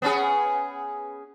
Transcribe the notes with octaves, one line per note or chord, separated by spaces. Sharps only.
B3 C#4 G#4